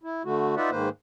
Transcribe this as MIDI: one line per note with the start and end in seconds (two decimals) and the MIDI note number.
0.03 0.23 64
0.25 0.55 50
0.25 0.55 57
0.25 0.55 66
0.57 0.70 63
0.57 0.70 65
0.57 0.70 71
0.57 0.70 74
0.57 0.70 76
0.57 0.70 78
0.70 0.89 44
0.70 0.89 51
0.70 0.89 58
0.70 0.89 71
0.70 0.89 72